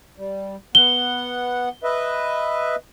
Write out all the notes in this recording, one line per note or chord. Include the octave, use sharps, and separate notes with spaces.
G3
B3 F#5 G7
B4 D#5 E5